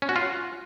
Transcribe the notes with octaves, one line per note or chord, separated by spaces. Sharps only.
C#4
F#4
F4